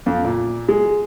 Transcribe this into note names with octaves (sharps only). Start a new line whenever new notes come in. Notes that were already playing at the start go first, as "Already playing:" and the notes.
F2
A#2
G#3